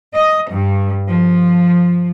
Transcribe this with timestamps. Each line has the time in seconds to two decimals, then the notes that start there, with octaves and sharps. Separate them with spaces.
0.15 D#5
0.51 G2
1.08 F3